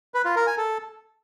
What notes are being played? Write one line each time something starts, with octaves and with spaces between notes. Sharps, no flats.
B4
F4
A#4
G#5
A4